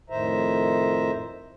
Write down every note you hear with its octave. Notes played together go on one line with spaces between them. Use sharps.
F2 A2 D#3 C5 E5 A#5